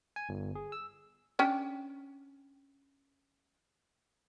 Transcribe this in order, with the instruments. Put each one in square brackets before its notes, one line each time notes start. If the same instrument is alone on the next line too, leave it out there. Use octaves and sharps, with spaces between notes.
[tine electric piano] G#5
G1
G#4
E6
[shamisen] C#4 D4 G5